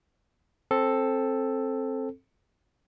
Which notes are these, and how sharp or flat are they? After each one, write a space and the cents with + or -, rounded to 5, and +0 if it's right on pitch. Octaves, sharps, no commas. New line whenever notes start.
C4 +15 A4 +0